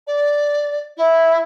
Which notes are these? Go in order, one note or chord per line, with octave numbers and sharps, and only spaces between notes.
D5
E4